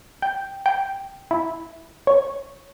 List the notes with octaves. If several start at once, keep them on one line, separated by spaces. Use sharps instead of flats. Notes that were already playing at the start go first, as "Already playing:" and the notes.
G5
G5
E4
C#5